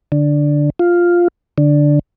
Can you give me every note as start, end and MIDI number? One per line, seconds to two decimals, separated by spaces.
0.12 0.70 50
0.79 1.28 65
1.58 1.99 50